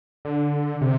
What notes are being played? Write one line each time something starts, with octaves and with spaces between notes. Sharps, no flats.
D3
C3